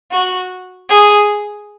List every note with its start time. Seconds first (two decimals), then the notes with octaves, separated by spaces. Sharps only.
0.12 F#4
0.89 G#4